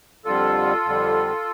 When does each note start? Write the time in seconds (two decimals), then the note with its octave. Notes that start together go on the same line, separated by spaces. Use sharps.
0.25 F2 D3 G3 F4 A4
0.85 F2 D3 G3